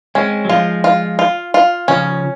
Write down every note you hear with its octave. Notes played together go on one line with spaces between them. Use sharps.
G#3 C4 C#4
F#3
F3 G#3 F4
F4
F4
F4
C#3 F3 C#4